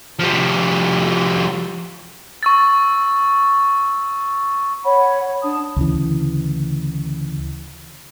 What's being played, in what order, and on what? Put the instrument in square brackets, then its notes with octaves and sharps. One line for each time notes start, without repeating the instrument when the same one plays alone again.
[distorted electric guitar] F3 G3
[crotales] C#6 E6 A6
[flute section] C#5 F#5 B5
C#5
D4 A5 D#6
[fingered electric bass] D2 C#3 E3